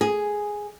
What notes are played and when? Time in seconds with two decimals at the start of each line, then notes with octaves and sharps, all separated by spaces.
0.01 G#4